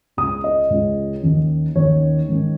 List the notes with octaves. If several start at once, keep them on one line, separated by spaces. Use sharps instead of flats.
C#2 C#3 G#3 C#4 D#6
D#5
C#2 C#3 G#3 C#4
D#2 D#3 C#4
D#2 D#3 C#4 C#5
G#2 D#3 C#4